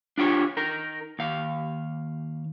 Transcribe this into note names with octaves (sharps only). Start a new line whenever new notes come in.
D4 F4 G4 C#5
D#4 A#4
D#2 F5